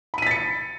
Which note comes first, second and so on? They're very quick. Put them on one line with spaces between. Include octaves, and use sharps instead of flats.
B5 D#7 B6 A6 C#7